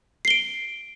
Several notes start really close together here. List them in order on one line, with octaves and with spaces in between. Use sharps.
C7 G7 D7